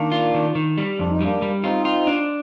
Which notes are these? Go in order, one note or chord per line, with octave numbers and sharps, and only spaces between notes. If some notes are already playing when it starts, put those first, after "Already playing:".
Already playing: D#3 A#3 D4
F4
D#3
D#3
G3
F2 D4
D#4
G3 A#3 D4
G3
C4 D#4 F4
F4
D4